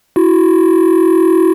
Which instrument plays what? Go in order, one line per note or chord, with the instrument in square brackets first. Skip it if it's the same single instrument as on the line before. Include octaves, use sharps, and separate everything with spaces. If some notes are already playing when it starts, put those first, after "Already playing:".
[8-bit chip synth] E4 F#4